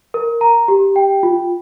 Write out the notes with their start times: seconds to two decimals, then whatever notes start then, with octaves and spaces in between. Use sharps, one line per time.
0.14 A#4
0.41 A#5
0.68 G4
0.96 G5
1.23 F4